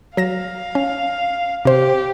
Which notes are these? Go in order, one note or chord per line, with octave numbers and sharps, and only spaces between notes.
F#3 F5 A#6 E7
C#4
C3 G4 C5